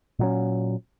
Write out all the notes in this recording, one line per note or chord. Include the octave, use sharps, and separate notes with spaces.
A#2 F#3 C#4